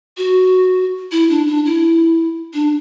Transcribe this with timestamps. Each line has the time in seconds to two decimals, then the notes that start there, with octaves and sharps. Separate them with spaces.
0.18 F#4
1.12 E4
1.30 D4
1.47 D4
1.66 E4
2.54 D4